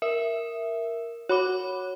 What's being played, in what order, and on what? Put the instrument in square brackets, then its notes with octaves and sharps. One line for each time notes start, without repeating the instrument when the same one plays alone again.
[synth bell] A#4 [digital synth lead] E5
[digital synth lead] F#4 [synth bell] C#5 B5 D6